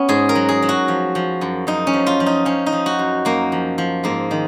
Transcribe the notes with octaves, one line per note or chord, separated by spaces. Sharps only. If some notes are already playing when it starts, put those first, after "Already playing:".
Already playing: B3 C#4
G#2 G#4
A#4
F#3
G#4
F#3
F#4
F3
F3
F#2
F#2 D#4
C#4
F3
F4
F3
D#4
F3 C#4
D#4
F3
F#4
F#2
F#2 A#3
F3
F3
G#2 A#3
D#3